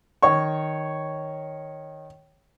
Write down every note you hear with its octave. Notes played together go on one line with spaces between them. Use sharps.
D#3 C#5 C#6